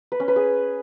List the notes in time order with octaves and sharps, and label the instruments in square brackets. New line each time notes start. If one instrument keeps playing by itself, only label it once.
[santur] B4
C#4
B4
G#4